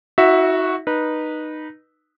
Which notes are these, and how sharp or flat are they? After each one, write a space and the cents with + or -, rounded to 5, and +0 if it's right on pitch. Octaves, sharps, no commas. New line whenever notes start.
D#4 +45 F#4 -5 E5 -5
D#4 -15 B4 -20